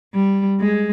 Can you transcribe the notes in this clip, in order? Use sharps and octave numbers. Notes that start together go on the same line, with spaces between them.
G3
G#3